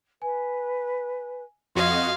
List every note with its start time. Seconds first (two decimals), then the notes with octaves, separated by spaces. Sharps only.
0.22 B4 G#5
1.75 F2 F#4 D#5 F5 C6 G#6